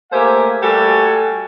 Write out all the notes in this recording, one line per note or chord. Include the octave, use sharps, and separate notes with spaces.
A3 A#3 G4 C5 F5 G#5
G3 A3 F#4 A4 G#5